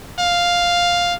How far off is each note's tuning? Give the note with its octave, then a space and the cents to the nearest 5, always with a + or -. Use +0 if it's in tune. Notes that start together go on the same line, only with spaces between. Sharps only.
F5 +5